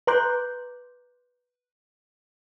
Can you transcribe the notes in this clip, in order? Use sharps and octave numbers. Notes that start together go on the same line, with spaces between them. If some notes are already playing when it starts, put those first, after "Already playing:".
B4 A#5 C6 D6 F#6 G6